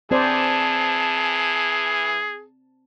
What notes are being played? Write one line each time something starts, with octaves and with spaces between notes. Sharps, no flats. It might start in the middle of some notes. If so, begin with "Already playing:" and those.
E3 C4 G#4 C5 D5 A5